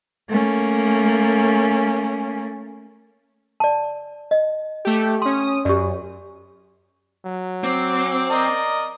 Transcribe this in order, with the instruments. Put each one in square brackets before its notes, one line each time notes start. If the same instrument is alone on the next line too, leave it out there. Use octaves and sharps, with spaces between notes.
[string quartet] A3 A#3 C#4
[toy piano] D5 A5
D#5
[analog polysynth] A3 G4
[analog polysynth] C#4 D#6 [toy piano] C6
[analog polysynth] F#2 [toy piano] G4 D5
[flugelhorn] F#3
[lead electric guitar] C4 [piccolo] D6
[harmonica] A#4 D5 D#5